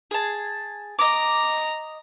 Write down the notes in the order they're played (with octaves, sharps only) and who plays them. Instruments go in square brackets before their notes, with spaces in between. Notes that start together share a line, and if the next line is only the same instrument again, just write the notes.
[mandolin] G#4 A5
[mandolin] D#5 D6 [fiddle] A#5